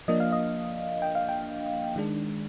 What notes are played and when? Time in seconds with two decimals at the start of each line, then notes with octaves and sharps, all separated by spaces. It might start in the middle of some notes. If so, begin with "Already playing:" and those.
0.08 F3 A#3 D4 D#5
0.20 F5
0.32 D#5
1.02 G5
1.15 F5
1.29 G5
1.96 D#3 G#3 D4